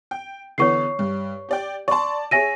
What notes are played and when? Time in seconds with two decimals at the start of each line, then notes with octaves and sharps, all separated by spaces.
0.11 G5
0.58 D3 E3 B3 C#5 C#6 C7
0.99 G2
1.49 G4 D5 G5
1.88 D5 A5 C6 C#6
2.31 G#4 C#5 E5 G#5 A#6 D#7